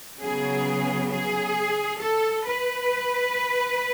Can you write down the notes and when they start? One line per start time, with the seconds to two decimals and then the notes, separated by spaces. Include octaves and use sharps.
0.21 C#3 F#3 B3 G#4
1.10 G#4
2.00 A4
2.45 B4